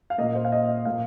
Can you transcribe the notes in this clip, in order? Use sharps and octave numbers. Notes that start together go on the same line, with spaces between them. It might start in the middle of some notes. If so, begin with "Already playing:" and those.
F5
A#2 A#3 D#5
C5
F5
D#5
D#5
A#2 A#3 F5